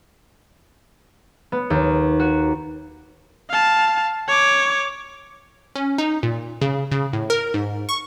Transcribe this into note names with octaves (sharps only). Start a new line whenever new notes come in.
B3
D#2
F#4
F5 A5
C#5 D6
C#4
D#4
A#2
C#3
C#3
A2
A#4
G#2
C#6